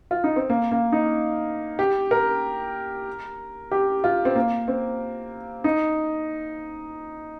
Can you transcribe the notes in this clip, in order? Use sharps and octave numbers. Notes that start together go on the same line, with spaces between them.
F4
D#4
C4
A#3
A#3
D#4
G4
A#4
G4
F4
C4
A#3
C4
D#4